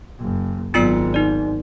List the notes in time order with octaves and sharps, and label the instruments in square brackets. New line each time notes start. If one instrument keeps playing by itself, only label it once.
[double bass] F#1
[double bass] G#1 [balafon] F#3 B3 [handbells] F4 E6 C#7
[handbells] D#4 D5